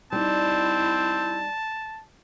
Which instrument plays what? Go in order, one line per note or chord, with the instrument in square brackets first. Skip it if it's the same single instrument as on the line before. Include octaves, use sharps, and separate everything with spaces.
[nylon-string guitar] G3 D#4 [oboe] C4 [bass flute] E4 [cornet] A5